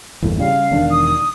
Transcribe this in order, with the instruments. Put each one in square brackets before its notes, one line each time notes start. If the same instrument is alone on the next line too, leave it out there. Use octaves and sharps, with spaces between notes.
[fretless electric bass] G1 E2 A2
[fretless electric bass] C#3 G3 [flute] F5
[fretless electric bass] E1 D#3 D4
[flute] D#6